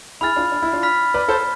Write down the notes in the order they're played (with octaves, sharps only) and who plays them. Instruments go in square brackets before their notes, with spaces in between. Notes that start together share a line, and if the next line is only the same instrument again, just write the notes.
[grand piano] E4 G#4 [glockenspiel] B5 F6 A6
[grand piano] D4 F4
D4
E4
D4 F4
[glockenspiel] B5 F6 B6
[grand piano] B4 D5
A4 C5